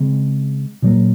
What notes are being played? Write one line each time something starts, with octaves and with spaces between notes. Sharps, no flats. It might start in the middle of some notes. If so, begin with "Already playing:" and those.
Already playing: C#3 G#3 C4
A#2 F#3 A#3